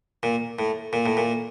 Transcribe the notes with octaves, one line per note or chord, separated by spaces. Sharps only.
A#2
A2
A#2
A2
A#2